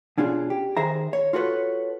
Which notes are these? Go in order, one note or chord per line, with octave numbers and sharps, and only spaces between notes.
B2 C#4 D4 F4 G#4
G4
D#3 G#4 C5 E5 A#5
C#5
F4 F#4 A4 B4 C#5